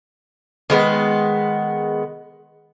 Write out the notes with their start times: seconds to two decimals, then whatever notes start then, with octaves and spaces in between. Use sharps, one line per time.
0.70 D#3 G#3 B3